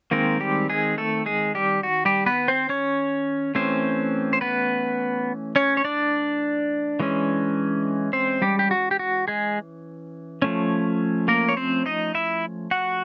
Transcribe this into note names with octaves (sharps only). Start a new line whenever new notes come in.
D#3 G#3 A#3 C4 A#4
G3 G4
G#3 G#4
A3 A4
G#3 G#4
G3 G4
F#4
G3 G4
B3 B4
C4 C5
C#4 C#5
E3 A3 C4 C#4 C5
C5
B3 B4
C#4 C#5
C#5
D4 D5
E3 G#3 C#4
C4 C5
G3 G4
G4
F#4
G4
F#4
G#3 G#4
F3 A3 C#4
A#3 A#4
C#5
C4 C5
D#4 D#5
E4 E5
F#4 F#5